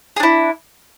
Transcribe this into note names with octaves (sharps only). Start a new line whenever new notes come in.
D4 E4 G#4